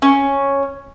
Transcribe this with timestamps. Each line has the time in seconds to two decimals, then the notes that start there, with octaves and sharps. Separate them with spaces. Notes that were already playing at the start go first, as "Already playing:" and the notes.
0.02 C#4